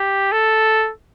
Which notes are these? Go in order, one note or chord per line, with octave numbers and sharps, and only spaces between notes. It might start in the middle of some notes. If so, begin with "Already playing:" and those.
Already playing: G4
A4